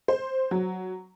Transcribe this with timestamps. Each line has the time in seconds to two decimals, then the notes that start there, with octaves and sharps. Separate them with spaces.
0.08 C5
0.51 F#3